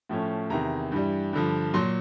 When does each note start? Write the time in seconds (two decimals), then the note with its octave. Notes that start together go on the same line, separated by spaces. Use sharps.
0.09 A2 F3 A3 C#4
0.50 E2 C3 D#3 A#5
0.92 G2 E3 G3
1.33 G2 D3 F3
1.74 A#2 F#3 C6